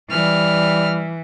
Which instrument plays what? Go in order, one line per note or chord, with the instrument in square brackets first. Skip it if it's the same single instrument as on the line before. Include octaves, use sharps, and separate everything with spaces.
[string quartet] E3 [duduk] G3 [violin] F6